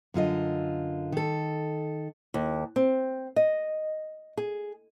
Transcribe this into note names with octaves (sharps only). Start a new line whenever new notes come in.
F#2 D3 F4 D#5
D#3 A4
D#2
C4
D#5
G#4